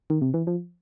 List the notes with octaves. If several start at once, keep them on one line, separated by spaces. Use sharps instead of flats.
D#3
C3
E3
F3